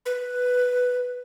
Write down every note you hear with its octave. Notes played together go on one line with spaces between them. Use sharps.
B4